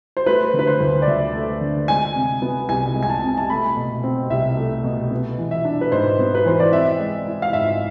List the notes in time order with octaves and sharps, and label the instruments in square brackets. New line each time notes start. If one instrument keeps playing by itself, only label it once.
[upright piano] C5
A3 B4
D3
B4
C5
D2
D5
D2 E5
A3
D3
G#3 G#5
C3
B3
C2 G#5
G#3
G#5
A5
C3
A5
A3 B5
B2
C4
C2 E5
A3
B2
B3
E3
E5
D4
B4
G#2 C5
B3
B4
E3 C5
D5
C4 E5
G#3
E4
F5
G#2 E5